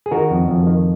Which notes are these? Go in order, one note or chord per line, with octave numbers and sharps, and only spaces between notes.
G#4
D#3 F#4 A#4
F2
F2
D#3